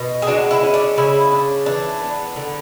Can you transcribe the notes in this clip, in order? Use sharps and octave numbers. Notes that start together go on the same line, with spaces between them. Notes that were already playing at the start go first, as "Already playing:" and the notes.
Already playing: B2
G#4
G#3 D4 F#4
E4
C#4
D4
C#3 E4
D4
E3 D4
B3
D3